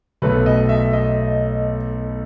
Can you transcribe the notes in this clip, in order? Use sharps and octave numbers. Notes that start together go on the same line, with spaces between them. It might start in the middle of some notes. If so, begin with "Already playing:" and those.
B1 B2 A3 B4
D#5
E5
D#5